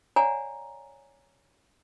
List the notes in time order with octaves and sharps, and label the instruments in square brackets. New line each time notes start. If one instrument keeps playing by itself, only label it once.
[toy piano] C#5 D5 F#5 G#5 A#5